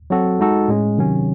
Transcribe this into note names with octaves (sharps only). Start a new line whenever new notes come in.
F#3 C4 F#4 A4
G#3 D#4 F#4 A4
A2 G#3 C#4
C3 D#3 F#3 C#4